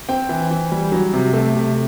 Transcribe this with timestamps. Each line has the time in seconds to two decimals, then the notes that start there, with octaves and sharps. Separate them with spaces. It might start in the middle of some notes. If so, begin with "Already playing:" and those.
0.09 C4 G5
0.29 E3
0.51 E3
0.72 G3
0.92 F#3
1.13 C3
1.34 A3
1.55 C3